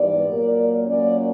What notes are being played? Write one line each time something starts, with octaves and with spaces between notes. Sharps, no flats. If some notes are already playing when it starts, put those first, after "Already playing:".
Already playing: G#2 E3 G3 B3 D5
A#2 F#3 A#3
A#2 F#3 A#3 C#4 D5